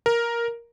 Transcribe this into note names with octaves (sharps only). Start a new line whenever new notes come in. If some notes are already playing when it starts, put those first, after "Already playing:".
A#4